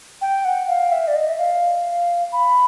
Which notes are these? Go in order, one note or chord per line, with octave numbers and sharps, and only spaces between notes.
G5
F#5
F5
E5
D5
D#5
E5
F5
B5